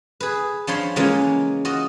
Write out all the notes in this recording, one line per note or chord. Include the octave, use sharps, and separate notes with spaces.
G#4 B4
F3 D4 F4 C#5 B5 C6
C#3 E3 G#3 A#3 C#4 F4
F4 F#4 D#5